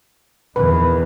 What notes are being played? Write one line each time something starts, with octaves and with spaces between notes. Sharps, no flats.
E2 D#3 B4